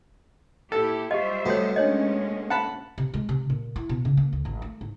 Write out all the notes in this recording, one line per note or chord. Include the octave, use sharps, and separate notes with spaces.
A#2 E4 G4 A4
G3 F4 G4 C5 D#5 E5
C3 A3 B3 F#4 C#5
G#3 A#3 C#4 D4 C#5 D#5
F#5 A5 B5
C3
G#3
C3
A#2
E4
B2
C#3
A#3
D2
G#1
A3
G#2